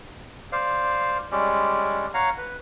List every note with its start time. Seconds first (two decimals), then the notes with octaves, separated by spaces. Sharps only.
0.52 C5 D5 F5
1.31 G3 G#3 C#4 D5
2.14 C#5 F5 F#5 A#5
2.38 B4